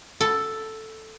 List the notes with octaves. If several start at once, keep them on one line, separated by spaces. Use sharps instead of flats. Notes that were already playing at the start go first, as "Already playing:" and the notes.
A4